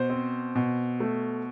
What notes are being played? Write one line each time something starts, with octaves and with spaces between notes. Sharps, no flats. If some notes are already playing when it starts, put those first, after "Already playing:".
Already playing: B2 C5
C4
B2
A3